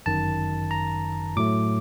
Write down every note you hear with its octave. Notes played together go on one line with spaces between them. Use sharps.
G1 F#2 D#3 A5
A#5
A2 F#3 A3 D6